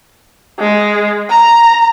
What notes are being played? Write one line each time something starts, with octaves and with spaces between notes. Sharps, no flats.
G#3
A#5